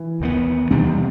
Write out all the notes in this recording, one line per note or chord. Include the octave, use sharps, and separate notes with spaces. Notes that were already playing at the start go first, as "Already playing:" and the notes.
Already playing: E3
D#2 D#3 G3 B3
E2 C3 D#3 G3 C4